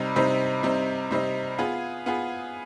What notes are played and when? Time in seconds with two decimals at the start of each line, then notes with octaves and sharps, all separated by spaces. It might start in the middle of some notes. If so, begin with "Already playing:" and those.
Already playing: C3 G3 C4 D#4
0.16 C3 G3 C4 D#4
0.63 C3 G3 C4 D#4
1.11 C3 G3 C4 D#4
1.58 B3 F4 G#4
2.06 B3 F4 G#4